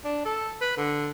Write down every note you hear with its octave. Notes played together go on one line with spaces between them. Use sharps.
D4
A4
B4
D3